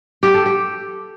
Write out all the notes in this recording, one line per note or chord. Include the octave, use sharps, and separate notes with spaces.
G4
A4
G4